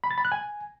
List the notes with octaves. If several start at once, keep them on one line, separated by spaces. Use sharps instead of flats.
B5
A6
B5
F#6
G#5